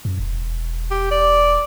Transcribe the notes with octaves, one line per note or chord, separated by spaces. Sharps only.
F#2
E1
G4
D5